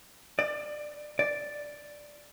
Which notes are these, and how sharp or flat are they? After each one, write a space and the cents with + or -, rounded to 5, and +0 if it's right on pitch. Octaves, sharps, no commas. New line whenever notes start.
D5 +20
D5 +0